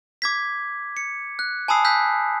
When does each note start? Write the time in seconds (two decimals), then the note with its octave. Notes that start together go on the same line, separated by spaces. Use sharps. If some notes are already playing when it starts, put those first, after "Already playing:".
0.22 D6 G#6 B6
0.97 C#7
1.39 F#6
1.68 G#5 A5 B5 D#6 E6 C7
1.85 E6 F#6 G6 B6